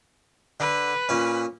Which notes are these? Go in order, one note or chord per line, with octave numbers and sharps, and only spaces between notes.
D3 B4
A#2 C#4